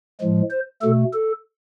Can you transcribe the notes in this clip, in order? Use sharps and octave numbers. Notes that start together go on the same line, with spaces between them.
A2 F3 G#3
C5
B2 A3 A4
A4